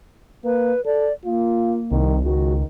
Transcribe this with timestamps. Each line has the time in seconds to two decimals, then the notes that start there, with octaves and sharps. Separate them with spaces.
0.45 A#3 B4
0.86 A4 D5
1.25 A#3 F4
1.91 C2 D#3
2.24 C#2 D#3 F#4